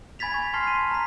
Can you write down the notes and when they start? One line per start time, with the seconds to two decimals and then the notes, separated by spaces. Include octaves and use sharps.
0.19 G#5 B5 G#6 A6 B6 F7
0.34 C#6
0.54 A5 C6 F6 B6 C7
0.67 D#7
0.91 A#5 B6